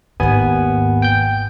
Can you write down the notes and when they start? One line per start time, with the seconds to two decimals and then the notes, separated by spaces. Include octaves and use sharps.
0.20 G#1 D#2 G#2 B3 G#5
1.02 G5 G6